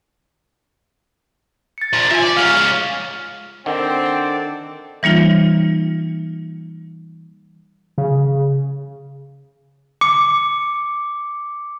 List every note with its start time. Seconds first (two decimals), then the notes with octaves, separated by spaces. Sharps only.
1.78 A6 C#7
1.93 A#2 F3
2.11 F4 E5 G#5
2.23 D5
2.37 G#2 C#4 F5 F6
3.66 D#3 C4 D4 A4 F#5
5.03 E3 G3 A#3 D#4 F4
7.98 C#3
10.01 D6 C#7